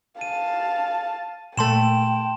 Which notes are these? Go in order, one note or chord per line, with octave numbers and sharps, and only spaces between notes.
F5 A5 D#7
A#2 A3 G5 A5 C6 E7